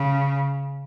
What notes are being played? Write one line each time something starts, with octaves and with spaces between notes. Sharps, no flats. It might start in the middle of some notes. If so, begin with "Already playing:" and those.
Already playing: C#3